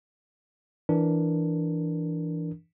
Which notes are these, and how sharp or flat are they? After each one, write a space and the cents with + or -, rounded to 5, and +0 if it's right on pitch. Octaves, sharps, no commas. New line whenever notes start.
E3 +0 D4 +0 A#4 +0